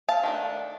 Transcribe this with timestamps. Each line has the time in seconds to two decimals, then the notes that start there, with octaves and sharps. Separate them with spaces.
0.09 F5 A5
0.23 D#3 A3 D4